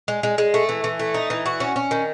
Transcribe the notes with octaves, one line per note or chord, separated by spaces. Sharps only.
G#3
G#3
G#3
A3
E3
E3
A3
D#4
E3
F#4
C#4
C#4
D#3